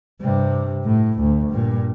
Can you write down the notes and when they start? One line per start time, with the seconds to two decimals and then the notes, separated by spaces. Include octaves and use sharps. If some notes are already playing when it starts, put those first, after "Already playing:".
0.21 G2 C3
0.84 A2
1.20 D2
1.50 G2 A#2